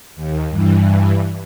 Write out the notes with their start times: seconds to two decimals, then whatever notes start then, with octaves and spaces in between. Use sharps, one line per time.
0.16 D#2
0.50 G2 E3